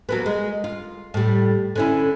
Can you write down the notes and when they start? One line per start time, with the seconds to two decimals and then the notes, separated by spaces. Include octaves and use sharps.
0.09 F#3 A#3 B3
0.26 G#3
0.64 F4
1.14 A2 G3
1.76 D3 C#4 E4